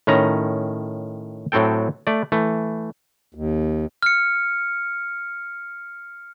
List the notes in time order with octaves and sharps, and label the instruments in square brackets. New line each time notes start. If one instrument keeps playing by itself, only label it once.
[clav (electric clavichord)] A2 D#3 C#4 A#5
A2 F#3 C4 A4 G5
A3 D5
E3 A3
[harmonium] D#2
[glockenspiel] F6 C#7